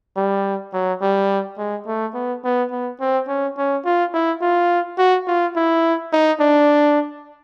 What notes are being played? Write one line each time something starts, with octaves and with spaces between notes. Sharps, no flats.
G3
F#3
G3
G#3
A3
B3
B3
B3
C4
C#4
C#4
F4
E4
F4
F#4
F4
E4
D#4
D4